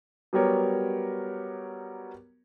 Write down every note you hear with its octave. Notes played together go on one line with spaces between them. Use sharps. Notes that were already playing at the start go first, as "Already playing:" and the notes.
F#3 G3 B3 G4 A#4 C#5